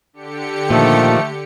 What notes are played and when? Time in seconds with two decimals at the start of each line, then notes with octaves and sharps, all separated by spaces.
0.13 D3 G4 C#7
0.70 A#2 D#3 F3 A3